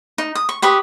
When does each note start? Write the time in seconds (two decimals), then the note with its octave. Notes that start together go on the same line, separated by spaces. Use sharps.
0.18 D#4
0.35 D#6
0.49 C#6
0.62 G4 B4 C#6 D#6